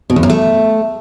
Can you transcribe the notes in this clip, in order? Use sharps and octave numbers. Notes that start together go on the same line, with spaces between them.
B2
E2
F#2
A3